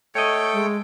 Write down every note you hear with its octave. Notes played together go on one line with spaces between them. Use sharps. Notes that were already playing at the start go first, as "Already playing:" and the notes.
A3 A4 C#5 D#5 G5
G#3